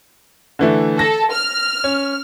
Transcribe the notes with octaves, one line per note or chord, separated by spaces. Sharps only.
D3 E3 A3
A4 A#6
F6
C#4